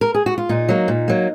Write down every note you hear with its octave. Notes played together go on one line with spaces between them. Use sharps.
A#4
G#4
F#4
F4
A#2 D#4
F#3 A#3
A#2
F#3 A#3